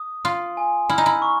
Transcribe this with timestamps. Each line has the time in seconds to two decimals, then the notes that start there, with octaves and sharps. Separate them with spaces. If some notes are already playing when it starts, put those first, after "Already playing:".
Already playing: D#6
0.25 F4 C6
0.57 G#5
0.90 E4 F6
0.98 D#4
1.06 E4
1.22 C#6